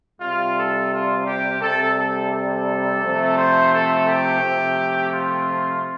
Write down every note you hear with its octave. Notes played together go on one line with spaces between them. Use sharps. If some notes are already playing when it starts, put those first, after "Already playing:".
C3 G3 F4
A4
F4
G4
C3 G3 A4
A4
A4
C3 F3 A3
C5
A4
G4
C3 F3 A3
F4